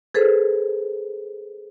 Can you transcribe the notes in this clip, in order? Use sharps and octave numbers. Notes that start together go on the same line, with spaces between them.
G#4 A4 B4 C5